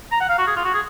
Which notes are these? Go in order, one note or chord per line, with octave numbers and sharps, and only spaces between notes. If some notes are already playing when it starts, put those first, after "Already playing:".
A#5
F#5
F5
F#4
G#4
F4
F#4
G#4